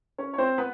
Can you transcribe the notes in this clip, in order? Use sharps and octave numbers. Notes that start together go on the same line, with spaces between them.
C#4 C#5
C#5
C4 C5
B3 B4